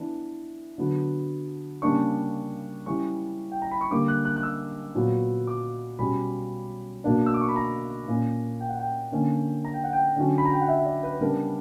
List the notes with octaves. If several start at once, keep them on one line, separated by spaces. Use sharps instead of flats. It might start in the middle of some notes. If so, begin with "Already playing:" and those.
Already playing: E3 B3 D4
D3 F#3 B3
C#3 G3 A#3 D4 C#6
E3 G3 C#4 C#6
G5
A#5
B5
C#6
D3 G3 A#3 D6
F#6
F#6
F#6
E6
A#2 F#3 B3
D6
B2 G3 C#4 B5
B2 A#3 D4
E6
D6
C#6
B5
A#5
A#2 A#3 C#4
G5
F#5
G5
D3 A#3 C#4
A#5
G5
F#5
G5
D3 F#3 C#4
B5
A#5
G5
F#5
E5
E5
D5
B4
C#3 G3 B3 D4 A#4